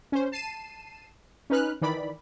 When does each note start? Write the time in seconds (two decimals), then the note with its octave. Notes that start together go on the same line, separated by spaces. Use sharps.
0.12 C#4 C5
0.32 A5 C7 D#7 E7
1.50 C#4 D#4 B4 F6 F#6
1.82 D#3 E3 D5 B5